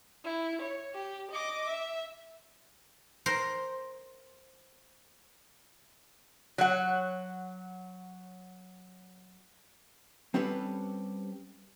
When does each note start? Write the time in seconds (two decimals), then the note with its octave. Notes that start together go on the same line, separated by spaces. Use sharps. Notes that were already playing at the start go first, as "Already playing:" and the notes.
0.24 E4
0.61 C#5
0.94 G4
1.31 D#5 D6
1.68 E5
3.26 A#4 C5
6.58 F#3 C#5 F#5
10.34 G3 C4 C#4 G4 A4 B4